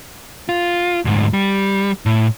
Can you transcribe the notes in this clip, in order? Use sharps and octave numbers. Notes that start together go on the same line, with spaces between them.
F4
D2 G#2
G3
A2